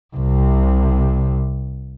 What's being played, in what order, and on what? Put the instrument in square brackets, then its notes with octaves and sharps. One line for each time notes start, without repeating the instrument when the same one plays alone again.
[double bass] C2 C3